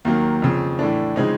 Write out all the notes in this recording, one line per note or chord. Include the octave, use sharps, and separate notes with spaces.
D#2 D#3 F#3 A#3
F2 C#3 F3
A2 E3 A3 D4
C#3 F3 G#3 C4 D#4